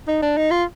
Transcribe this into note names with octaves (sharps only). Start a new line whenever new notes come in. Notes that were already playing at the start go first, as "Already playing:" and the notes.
D#4
D4
D#4
F4